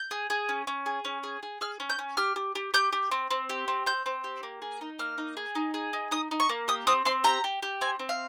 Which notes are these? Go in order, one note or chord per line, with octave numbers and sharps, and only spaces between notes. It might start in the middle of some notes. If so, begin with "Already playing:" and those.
Already playing: G6
G#4
G#4
C#4
C#4
G#4
C#4
G#4
G#4
G#4 F6
C#4
G6
C#4
G4 F6
G4
G4
G4 G6
G4
C4
C4
G4
C4
C4 G6
C4
G4
A#3
G#4
D#4
A#3 F6
D#4
G#4
D#4
G#4
D#4
D#4 D#6
D#4
C#6
A#3
G4 D#6
C4 D#6
C4 C6
G4 A#5
G4
G4
C4 G#5
C4
F5